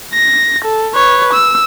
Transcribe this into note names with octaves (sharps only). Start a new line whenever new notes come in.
A#6
A4
B4 C#5
E6